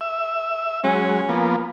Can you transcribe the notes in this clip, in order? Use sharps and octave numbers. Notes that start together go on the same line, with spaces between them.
E5
F#3 G#3 C#4
F3 A#3 B3